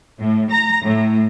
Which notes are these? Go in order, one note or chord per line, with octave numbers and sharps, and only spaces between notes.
A2
A#5
A2